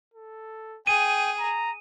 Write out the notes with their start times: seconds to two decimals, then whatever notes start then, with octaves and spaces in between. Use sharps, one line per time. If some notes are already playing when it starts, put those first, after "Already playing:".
0.14 A4
0.87 G#4 G5 D#7
1.40 A#5